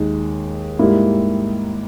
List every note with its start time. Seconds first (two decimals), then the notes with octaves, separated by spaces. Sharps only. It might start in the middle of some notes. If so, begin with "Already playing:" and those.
Already playing: D#2 D#3 G#3 D#4
0.79 G#2 G3 A#3 E4